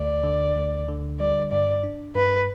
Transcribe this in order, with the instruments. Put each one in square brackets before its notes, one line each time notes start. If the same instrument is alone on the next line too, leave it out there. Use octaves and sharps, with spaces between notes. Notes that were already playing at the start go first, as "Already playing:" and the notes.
Already playing: [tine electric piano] D2 [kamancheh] D5
[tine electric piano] D3
D2
D3
[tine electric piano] G3 [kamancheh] D5
[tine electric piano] G2 [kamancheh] D5
[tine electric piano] D4
[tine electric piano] G2 [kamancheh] B4